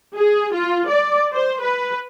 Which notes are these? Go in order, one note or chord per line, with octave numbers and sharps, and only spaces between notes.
G#4
F4
D5
C5
B4